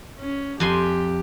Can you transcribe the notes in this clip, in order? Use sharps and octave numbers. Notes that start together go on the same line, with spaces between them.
C#4
F2 G4 G#5 C6